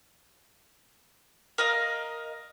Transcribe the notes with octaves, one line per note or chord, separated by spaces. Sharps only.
A#4 D#5 F5